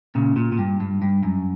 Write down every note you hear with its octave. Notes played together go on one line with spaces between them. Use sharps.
A#2 C#3
A#2
A#2
G2
G2
G2
F#2